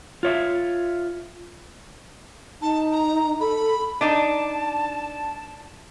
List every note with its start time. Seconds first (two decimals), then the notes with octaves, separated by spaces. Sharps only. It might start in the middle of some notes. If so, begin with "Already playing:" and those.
0.23 F4 C#5 E5
2.62 D#4 A5
2.92 A#5
3.40 A4 B5
4.01 D4 D#4 D5 A5